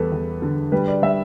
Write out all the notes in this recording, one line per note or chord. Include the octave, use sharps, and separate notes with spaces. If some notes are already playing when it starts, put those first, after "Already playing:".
Already playing: E2 G3 A4 B4
E2
D3
G3 B4
D5
G3 E5